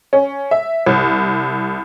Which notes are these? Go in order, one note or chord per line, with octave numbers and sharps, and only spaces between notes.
C#4
E5
C2